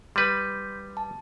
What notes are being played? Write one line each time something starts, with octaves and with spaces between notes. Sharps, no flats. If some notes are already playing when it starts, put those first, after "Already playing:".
G3 B4 C6 G6 B6
A5